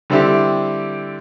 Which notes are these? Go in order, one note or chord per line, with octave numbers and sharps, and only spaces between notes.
D3 G3 C4 D4 E4 G4